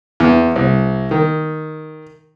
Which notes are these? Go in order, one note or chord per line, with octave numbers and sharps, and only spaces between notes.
E2
C2
D#3